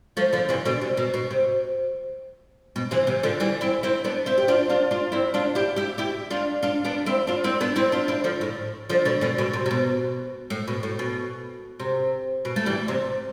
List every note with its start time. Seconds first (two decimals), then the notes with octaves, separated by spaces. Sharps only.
0.17 F3 A3
0.33 D3 F3
0.49 C3 E3
0.65 B2 D3
0.81 C3
0.97 B2
1.14 B2
1.31 C3
2.76 B2
2.91 C3 E3
3.07 C3 E3
3.23 D3 F3
3.40 E3 G3
3.61 C4 E4
3.83 C4 E4
4.04 B3 D4
4.26 C4 E4
4.38 G4
4.48 D4 F4
4.69 D4 F4
4.91 D4 F4
5.12 C4 E4
5.34 D4 F4
5.55 E4 G4
5.76 E4 G4
5.98 E4 G4
6.30 D4 F4
6.63 D4 F4
6.85 B3 D4
7.06 C4 E4
7.27 D4 F4
7.44 C4 E4
7.61 B3 D4
7.76 C4 E4
7.92 D4 F4
8.08 C4 E4
8.24 D3 F3
8.41 A2
8.89 D3 F3
9.05 B2 D3
9.21 B2 D3
9.38 B2 D3
9.53 C3
9.66 C3
9.71 B2
10.50 A2
10.68 B2
10.83 A2
10.99 B2
11.80 C3
12.45 B2
12.56 A3
12.66 E3 G3
12.88 C3